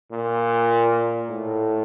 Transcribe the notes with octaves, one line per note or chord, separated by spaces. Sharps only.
A#2
A2